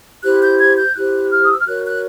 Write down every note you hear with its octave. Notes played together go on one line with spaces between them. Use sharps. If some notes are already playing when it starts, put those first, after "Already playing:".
E4 G4 C5 F#6
G6
G#6
G6
E4 G4 C5 F#6
F6
D#6
E6
F6
F#4 A#4 C#5 F#6
F#6